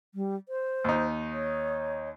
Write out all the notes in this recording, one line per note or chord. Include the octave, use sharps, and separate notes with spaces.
G3
C5
D#2 D#4
C#5